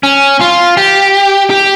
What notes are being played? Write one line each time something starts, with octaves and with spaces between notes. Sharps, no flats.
C#4
F4
G4
G4